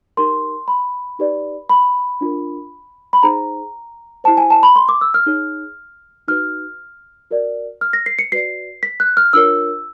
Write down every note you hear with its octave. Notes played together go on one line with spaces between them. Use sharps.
D#4 G4 A#4 C6
B5
D#4 G4 B4 D5
B5
D4 F4 A#4
B5
D#4 G#4 C5 A#5
E4 G4 C5 A5
G#5
A5
B5
C6
D6
E6
F6
D#4 G#4 C#5
D#4 F#4 B4 F6
F#4 A#4 D5
F6
A#6
C7
C#7
F#4 B4 D5 C7
B6
F#6
F6
D4 F4 A#4 C#5 E6